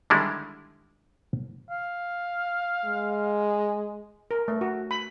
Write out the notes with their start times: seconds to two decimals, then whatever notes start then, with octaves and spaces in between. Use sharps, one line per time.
0.10 D3 D#3 G3 G#3 E4
1.70 F5
2.85 G#3
4.31 A#4
4.48 A3
4.61 F#4
4.91 B5